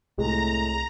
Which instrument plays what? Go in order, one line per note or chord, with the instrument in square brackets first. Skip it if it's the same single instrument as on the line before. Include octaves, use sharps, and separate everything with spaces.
[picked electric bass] C2 C3 [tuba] A2 [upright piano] G#3 [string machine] A#5